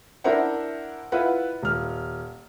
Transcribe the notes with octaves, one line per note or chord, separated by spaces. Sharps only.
D4 E4 A#4 C5 E5 F#5
E4 F4 B4 F#5
D#1 F6